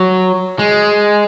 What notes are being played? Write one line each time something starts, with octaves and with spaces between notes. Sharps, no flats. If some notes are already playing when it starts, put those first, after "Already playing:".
Already playing: F#3
G#3